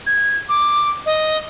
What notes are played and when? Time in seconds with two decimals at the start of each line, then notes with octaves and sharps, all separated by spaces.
0.06 G#6
0.49 D6
1.05 D#5